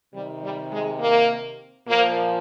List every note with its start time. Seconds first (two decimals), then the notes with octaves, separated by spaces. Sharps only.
0.13 C3 D#3 G3
0.43 G3
0.72 G#3
1.00 A#3
1.87 A#2 F3 A#3